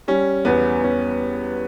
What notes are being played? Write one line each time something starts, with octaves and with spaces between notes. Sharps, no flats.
G3 C#4
E2 B3
E2 C#4